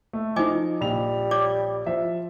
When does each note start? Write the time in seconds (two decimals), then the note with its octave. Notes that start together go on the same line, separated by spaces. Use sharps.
0.13 A3
0.36 F3 D#4 D#5 G#5 D6
0.81 A#1 G3 F7
1.31 C#5 D5 D6
1.86 F3 E5